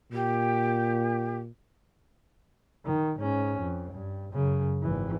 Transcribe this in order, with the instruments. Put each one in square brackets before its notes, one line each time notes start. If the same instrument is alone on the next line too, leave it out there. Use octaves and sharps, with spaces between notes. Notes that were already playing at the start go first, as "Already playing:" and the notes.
[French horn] A#2 [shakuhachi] G4
[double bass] D#3
G#2 C#4
F2
G2
F#2 C#3
G#1 E3